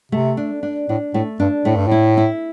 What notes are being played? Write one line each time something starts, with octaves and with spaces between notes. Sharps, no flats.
C3 A3
D4
D4
A2 D4
A2 A3
G2 D4
A2 A3
G2
A2 E4
E4